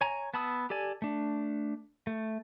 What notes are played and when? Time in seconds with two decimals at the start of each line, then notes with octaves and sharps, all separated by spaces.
0.01 C#5 G#5 A#5
0.34 B3 A5 B5 D#6 E6
0.70 G4 A4 D5 G#5
1.02 A3 D4
2.07 A3